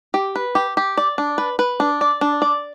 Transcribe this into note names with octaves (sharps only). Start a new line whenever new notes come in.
G4
B4
G4
G4
D5
D4
B4
B4
D4
D5
D4
D5